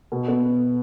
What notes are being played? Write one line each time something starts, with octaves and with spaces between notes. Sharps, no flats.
B2
B3